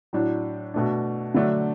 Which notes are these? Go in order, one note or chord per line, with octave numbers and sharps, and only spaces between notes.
A2 F#3 D4
B2 A3 D4
D3 F#3 A3 D4